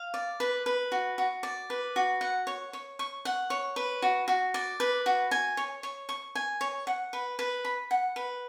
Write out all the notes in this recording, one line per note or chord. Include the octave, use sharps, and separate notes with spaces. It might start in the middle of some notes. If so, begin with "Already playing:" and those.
Already playing: F5
D5
B4
B4
F#4
F#4
D5
B4
F#4
F#5
C#5
C#5
C#6
F#5
C#5
B4
F#4
F#4
D5
B4
F#4
G#5
C#5
C#5
C#6
G#5
C#5
F#5
B4
B4
B5
F#5
B4